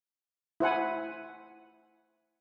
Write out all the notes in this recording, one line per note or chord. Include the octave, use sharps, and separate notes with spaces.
E4 C5 F#5 G#5